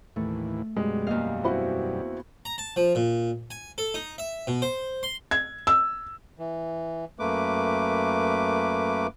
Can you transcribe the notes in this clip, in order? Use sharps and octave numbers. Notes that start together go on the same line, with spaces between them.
D#2 A2 E3 A3
F#2 B2 G3 G#3
E2 A#3 D#5 F5
C4 E4 F#4
A#5
A5
F3
A#2
G#5
A4
D#4
E5
B2
C5
C6
G#6
E6
E3
F#2 A3 A#3 B4 D6